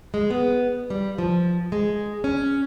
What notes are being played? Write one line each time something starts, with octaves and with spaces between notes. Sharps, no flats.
G#3
B3
G3
F3
G#3
C#4